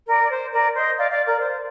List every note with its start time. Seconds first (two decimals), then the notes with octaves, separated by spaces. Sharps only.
0.07 A#4 D5
0.22 D5
0.30 C5
0.52 A#4 D5
0.74 C5 D#5
0.96 D5 F5
1.10 D5 F5
1.25 A#4 D5
1.40 C5